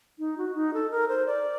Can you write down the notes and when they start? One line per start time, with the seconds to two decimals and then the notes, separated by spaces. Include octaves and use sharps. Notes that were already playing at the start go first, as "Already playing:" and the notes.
0.19 D#4
0.38 F#4
0.55 D#4
0.74 A4
0.91 A#4
1.09 C5
1.27 D5